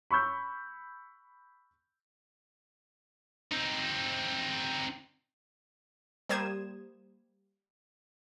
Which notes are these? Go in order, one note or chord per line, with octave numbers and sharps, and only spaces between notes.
B5 C#6 E6 G6
C4 D#4
G3 A#3 C5 D#6 G#6 E7